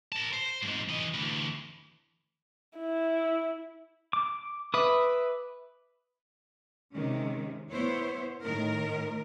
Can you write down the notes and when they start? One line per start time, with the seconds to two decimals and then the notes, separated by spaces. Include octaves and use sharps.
0.12 A#4 A5
0.33 C5
0.62 F2 G#2
0.89 E3 D#5
1.14 D2 E3
2.78 E4
4.13 D6
4.74 B4 E5 D6 D#6
6.94 C3 D#3 G#3 C#4
7.69 B3 E4 C5 C#5
8.43 A2 D#3 A#4